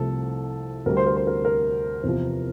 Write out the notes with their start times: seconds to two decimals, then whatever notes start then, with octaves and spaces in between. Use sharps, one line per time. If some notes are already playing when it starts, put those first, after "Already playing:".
Already playing: C2 C3 F3 A3 A4
0.86 D2 D3 G3 A#4
0.97 C5
1.06 A#4
1.17 C5
1.27 A#4
1.45 A#4
2.04 E2 C3 F3